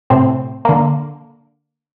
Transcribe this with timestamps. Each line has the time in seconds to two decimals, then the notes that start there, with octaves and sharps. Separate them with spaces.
0.10 A2 C3 C4
0.65 D3 A#3